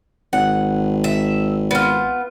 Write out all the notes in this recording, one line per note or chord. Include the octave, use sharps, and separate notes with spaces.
G#1 F#5
E5
B3 F4